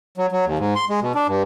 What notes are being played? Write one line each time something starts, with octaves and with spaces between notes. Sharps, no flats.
F#3
F#3
D#2
G#2
C6
G#3
B2
D4
G2